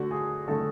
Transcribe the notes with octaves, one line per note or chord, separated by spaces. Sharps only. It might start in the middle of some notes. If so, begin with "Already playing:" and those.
Already playing: D3 A3 F#4
G#4
D3 A3 A4